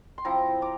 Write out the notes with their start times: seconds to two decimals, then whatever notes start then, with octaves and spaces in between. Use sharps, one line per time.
0.18 C6
0.25 F3 C4 E4 G5 A#5
0.62 A#5 D6